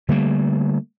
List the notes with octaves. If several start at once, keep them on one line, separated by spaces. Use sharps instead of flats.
D3 G3 A3 A#3